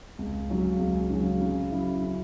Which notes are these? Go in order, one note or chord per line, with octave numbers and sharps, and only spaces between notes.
C#2
C#3 F#3 C#4
C#2
C#3 F#3 C#4
C#3
F#3 C#4 E4
C#3